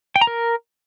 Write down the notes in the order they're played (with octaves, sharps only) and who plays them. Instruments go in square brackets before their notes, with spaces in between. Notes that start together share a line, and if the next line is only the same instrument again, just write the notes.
[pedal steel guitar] G5
A#5
A#4